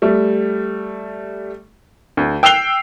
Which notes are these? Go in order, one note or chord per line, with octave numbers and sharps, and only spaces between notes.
G3 A3
D2
G5 E6 F#6 C7 F7 G7